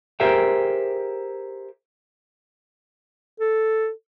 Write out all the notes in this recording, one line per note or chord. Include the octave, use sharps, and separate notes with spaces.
G4 G#4 A#4 C5 E5 G5
A4